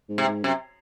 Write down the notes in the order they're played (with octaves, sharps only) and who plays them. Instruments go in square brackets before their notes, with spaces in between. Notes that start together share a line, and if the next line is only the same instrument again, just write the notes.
[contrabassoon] G#2
[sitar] C3
[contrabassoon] G#2
[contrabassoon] F#2 [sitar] C3